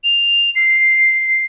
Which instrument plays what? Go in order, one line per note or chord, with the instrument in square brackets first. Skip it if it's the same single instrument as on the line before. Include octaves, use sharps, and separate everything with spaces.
[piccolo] F7
C7